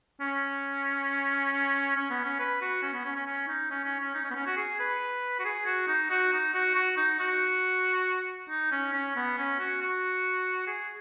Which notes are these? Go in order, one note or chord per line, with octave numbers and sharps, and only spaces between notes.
C#4
C#4
B3
C#4
B4
F#4
C#4
B3
C#4
C#4
C#4
D#4
C#4
C#4
C#4
D#4
C#4
B3
C#4
F#4
G#4
B4
F#4
G#4
F#4
D#4
F#4
D#4
F#4
F#4
D#4
F#4
D#4
C#4
C#4
B3
C#4
F#4
F#4
G#4